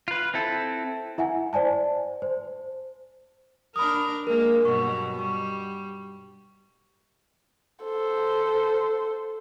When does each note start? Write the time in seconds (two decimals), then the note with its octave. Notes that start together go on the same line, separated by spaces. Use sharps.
0.08 F4 B4
0.34 C4 E4 A4
1.18 E4 E5 F#5 G#5
1.53 C5 D5 G#5 A5
2.22 C5
3.76 D4 A#4 B5 D#6
4.27 G#3 A#3 A#4
4.65 G2 B2 F#3 C#6
5.19 G3 C#6
7.85 A4 C5